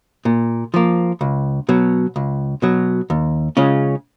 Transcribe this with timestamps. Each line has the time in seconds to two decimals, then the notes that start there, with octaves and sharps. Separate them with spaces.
0.25 A#2
0.74 F3 A#3
1.21 C#2
1.69 B2 F#3
2.16 C#2
2.62 B2 F#3
3.10 D#2
3.57 C#3 G#3 C#4 F4